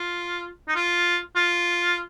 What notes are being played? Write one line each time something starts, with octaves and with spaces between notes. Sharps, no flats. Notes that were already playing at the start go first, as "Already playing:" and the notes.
Already playing: F4
D#4
F4
F4